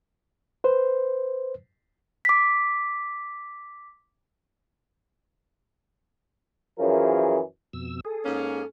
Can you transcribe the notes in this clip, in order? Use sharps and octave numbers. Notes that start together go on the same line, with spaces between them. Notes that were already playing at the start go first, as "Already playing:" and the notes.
B4 C5
D6 B6
F#2 E3 F3 C#4 G#4 A#4
F2 B2 E6
G#4 A4
G#2 A#3 C#4